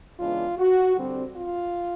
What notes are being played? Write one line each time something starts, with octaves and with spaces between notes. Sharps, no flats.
C#3 E3 G#3 B3 D4 F4
F#4
D3 G3 C4
F4